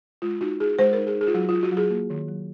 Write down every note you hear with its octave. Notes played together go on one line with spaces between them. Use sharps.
G#3 F4
D#4 F#4
D#4 G#4
G#3 C5
D#4 A#4
G#4
D#4
G#4
F4
F#3 F#4
F4
F#3
F#4
F#3
G#4
A#3
D#3
F#3